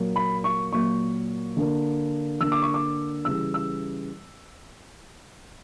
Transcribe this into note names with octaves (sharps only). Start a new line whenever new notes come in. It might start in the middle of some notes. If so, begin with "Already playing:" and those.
Already playing: A#2 F#3 A#3
B5
C#6
A#2 F#3 A#3 C#6
D3 A#3
D3 A#3 E6
D6
C#6
D6
C#3 E3 G3 E6
E6